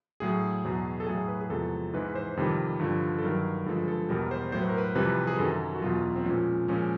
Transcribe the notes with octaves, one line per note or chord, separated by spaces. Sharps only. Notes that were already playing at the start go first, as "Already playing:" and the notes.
A2 F#3 G#4
E2 B2 F#3
A4
A2 F#3 G#4
B4
G#4
E2 C3 F3 G#3 A4
G#2 E3 G#3 B4
C5
F2 C3 D#3 G3
G2 D3 F3
A4
G2 D#3 F#3 A#4
G2 D3 F3 G#3 A4
A4
E2 B2 G3 A#4
C5
A2 F#3 C5
B4
A#4
B4
F2 C3 E3 G3 B4
G#4
F#2 D#3 F#3 A4
F#4
E2 B2 F#3 F4
C4
A#2 F3 G#3 C#4
A#2 F3 G#3 C#4